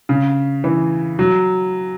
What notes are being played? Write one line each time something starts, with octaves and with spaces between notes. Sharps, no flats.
C#3
E3
F#3